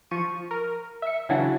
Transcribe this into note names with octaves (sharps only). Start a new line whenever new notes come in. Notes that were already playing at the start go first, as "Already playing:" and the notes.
F3 C#6 D#7
A#4
E5 C#7
C#3 E3 F#3 D4 F#4